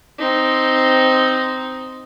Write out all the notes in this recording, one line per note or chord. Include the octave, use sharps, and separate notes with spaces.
C4 D#4